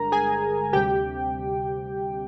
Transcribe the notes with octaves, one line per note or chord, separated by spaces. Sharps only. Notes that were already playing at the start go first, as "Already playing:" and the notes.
Already playing: G1 G2 D3 G#3 A#4 A#5
G#4 G#5
D2 C3 G3 G4 G5